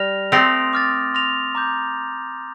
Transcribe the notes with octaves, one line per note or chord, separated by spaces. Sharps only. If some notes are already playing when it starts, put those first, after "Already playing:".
Already playing: G3 F6 A#6 F7
A3 C4 C6 D#6 A#6 D7 F7
D6 F6 A6
C6 F6 A#6 F7
A#5 D6 G6